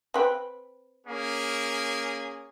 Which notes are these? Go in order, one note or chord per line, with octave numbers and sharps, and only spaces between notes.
C4 B4 G5
A#3 C#4 G#4